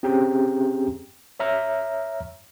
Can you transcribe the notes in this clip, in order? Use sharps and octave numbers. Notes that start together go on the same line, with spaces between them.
C4 C#4 G4 G#4 G5 A#5
C#5 E5 A#5 F6